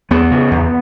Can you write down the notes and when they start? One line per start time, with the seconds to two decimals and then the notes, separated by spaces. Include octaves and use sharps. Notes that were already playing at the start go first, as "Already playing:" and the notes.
0.11 E2 B3
0.31 C#3
0.51 E2